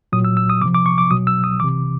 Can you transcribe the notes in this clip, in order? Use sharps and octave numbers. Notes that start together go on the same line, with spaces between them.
A#2 F#3 D#6
E6
E6
D#6
C3 F3 D6
D6
C#6
D6
B2 F#3 D#6
E6
D#6
C3 E3 D6